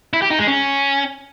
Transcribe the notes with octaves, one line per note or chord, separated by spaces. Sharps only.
E4
G4
D#4
G#3
C#4